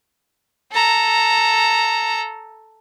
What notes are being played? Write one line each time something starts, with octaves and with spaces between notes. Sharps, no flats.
A4 A#5